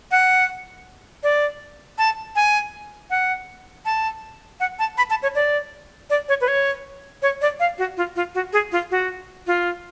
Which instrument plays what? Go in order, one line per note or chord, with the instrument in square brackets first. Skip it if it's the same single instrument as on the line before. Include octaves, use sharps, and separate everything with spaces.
[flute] F#5
D5
A5
G#5
F#5
A5
F#5
A5
B5
A5
C#5
D5
D5
C#5
B4
C#5
C#5
D5
F5
F#4
F4
F4
F#4
G#4
F4
F#4
F4